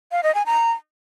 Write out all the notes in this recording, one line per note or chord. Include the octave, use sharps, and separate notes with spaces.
F5
D#5
G#5
A#5